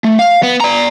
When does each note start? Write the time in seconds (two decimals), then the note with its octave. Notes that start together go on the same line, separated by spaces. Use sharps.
0.04 A3
0.19 F5
0.43 B3
0.61 D5 A#5